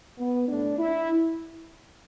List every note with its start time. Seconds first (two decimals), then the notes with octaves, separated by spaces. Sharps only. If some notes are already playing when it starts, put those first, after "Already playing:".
0.19 B3
0.48 A2 A3 D4
0.78 E4